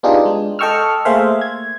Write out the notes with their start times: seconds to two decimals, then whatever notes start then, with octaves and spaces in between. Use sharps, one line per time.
0.03 B3 D4 D#4 F4 G4 G#4
0.25 G#3
0.59 A4 D#5 G5 C#6 E6 F6
1.05 A3 A#3 G#4 C5 E5 F5
1.41 G#6